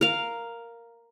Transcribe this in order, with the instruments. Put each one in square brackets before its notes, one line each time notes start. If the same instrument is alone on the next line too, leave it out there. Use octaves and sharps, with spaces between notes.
[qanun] A#4 F5